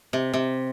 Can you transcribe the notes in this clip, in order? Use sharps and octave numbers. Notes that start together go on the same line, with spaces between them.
C3
C3